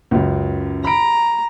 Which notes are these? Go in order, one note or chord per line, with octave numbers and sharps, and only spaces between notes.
C#2 F#2
A#5 B5 D7